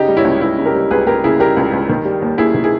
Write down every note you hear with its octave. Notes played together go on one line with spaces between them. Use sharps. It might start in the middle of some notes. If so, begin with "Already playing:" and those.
Already playing: C#3 D#4 G4
G3
C#4 E4
C#2
C#2 C#4 E4
C#3
G4 A#4
G3
C#2 G#4 B4
C#2 G4 A#4
C#3 E4 G#4
G3 G4 A#4
C#2
C#2
D#3
G3
D#2
D#2 E4 G#4
D#3
E4 G#4